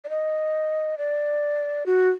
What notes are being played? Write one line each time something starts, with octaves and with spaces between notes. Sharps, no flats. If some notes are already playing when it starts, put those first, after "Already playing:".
D5
D#5
D5
F#4